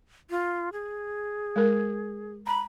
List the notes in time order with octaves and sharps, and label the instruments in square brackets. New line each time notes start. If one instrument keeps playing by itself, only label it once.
[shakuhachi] F4
G#4
[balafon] G#3 A#4
[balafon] A#5 [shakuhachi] B5